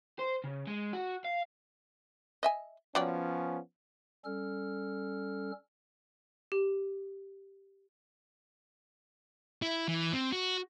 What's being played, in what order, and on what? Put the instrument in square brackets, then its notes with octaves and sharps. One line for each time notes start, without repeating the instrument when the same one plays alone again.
[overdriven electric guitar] C5
C#3
G#3
F#4
F5
[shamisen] D#5 E5 G#5
[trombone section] F3 B3 C#4 [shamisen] F#3 D5 G5
[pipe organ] G3 C#4 A4 F6
[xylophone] G4
[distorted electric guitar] E4
E3
C4
F#4